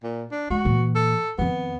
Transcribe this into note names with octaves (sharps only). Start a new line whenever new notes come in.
A#2
D4
G#3 F#4
A#2 E3
A4
F2 D#3 B3